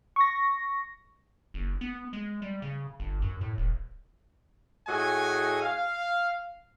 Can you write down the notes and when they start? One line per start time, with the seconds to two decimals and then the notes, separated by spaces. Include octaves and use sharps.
0.16 C#6 A#6
1.54 F#1
1.81 B3
2.13 G#3
2.42 G3
2.62 C#3
3.00 G1
3.22 F#2
3.41 A2
3.58 D#1
4.87 A2 F#4 G#4 D#5 G#5
5.62 F5